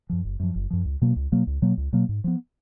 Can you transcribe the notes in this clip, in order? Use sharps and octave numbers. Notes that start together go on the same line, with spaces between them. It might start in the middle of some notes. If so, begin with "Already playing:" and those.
F#2 F3
F#1
F#2 F3
F#1
F#2 F3
C#2
B2 F#3 A#3
C#2
B2 F#3 A#3
C#2
B2 F#3 A#3
C#2
B2 F#3 A#3
G#2
F3 B3